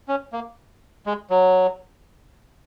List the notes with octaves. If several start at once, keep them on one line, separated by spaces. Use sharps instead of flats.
C#4
A#3
G#3
F#3